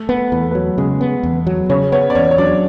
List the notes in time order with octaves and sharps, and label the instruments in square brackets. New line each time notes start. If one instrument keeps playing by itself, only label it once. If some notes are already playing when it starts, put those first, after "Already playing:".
Already playing: [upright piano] A3 A4
[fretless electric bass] B3
[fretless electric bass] E2 [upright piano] B4
[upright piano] A4
[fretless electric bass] F#3 [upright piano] B3 B4
[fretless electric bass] C#3 [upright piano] G#3 G#4
[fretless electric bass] B3
E2
F#3
[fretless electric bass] C#3 [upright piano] C#4 C#5
[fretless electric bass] B3 [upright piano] C#4 C#5
[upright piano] D5
[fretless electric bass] E2 [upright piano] C#4 C#5
[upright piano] C#5
[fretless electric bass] F#3 [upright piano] D4 D5